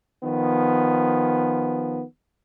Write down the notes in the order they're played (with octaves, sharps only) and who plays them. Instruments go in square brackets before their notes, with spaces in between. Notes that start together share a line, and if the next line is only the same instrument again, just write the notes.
[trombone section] D#3 F3 B3